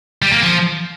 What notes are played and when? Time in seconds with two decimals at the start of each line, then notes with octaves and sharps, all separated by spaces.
0.22 G3
0.32 A#3
0.43 F3